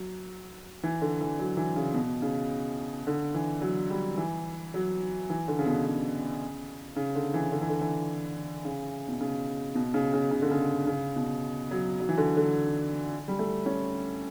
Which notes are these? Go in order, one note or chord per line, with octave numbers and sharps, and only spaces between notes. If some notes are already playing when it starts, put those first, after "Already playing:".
Already playing: F#3
E3
D3
E3
F#3
E3
C#3
B2
C#3
D3
E3
F#3
G3
E3
F#3
E3
D3
C#3
B2
C#3
C#3
D3
E3
D3
E3
D3
E3
C#3
B2
C#3
B2
C#3
C#3
C#3
D3
C#3
C#3
B2
F#3
F#3
E3
D3
D3
G3
A3
C#4